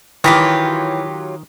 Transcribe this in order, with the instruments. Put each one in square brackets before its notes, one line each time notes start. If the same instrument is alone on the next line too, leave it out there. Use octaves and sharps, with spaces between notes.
[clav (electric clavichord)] D#3 [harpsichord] E3 [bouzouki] F#3 F4 G4 [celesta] G5 A#6 B6